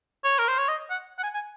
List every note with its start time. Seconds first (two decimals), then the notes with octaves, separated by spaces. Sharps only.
0.24 C#5
0.39 A#4
0.48 C5
0.58 C#5
0.69 D#5
0.90 F#5
1.19 F#5
1.24 G#5
1.34 G#5